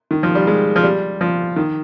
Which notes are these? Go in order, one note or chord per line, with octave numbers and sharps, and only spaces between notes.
D#3
F3
G3
G#3
F3
G3
F3
D#3